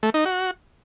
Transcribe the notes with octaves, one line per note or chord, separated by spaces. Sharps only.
A3
D#4
F#4